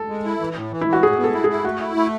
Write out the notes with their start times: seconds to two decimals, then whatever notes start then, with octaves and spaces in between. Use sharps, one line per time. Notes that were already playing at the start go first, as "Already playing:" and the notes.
Already playing: A4
0.09 G#3
0.25 E4
0.40 E3
0.56 A2
0.72 E3
0.81 E4
0.87 E3
0.93 F#4
1.02 A2 G#4
1.18 B3
1.24 A4
1.34 E4
1.44 G#4
1.49 E4
1.64 A3 F#4
1.80 E4
1.96 A3